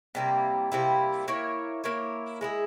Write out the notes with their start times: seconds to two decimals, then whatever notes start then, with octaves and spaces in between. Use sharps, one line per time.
0.15 C3 G3 A#3 E4
0.72 C3 G3 A#3 E4
1.28 A#3 E4 A#4 C#5
1.84 A#3 E4 A#4 C#5
2.41 G#3 E4 G#4